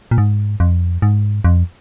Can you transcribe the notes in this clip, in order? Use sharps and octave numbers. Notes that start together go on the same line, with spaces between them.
A#2
G#2
F2
G#2
F2